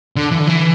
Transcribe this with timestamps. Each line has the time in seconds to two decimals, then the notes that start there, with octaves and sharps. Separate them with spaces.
0.16 D3
0.32 E3
0.40 D3
0.47 E3